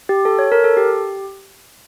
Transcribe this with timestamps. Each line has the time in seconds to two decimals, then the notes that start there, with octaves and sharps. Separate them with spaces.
0.09 G4
0.25 A4
0.39 C#5
0.52 A#4
0.64 A4
0.77 G4